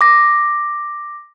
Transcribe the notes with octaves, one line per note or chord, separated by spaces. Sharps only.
D6 A#6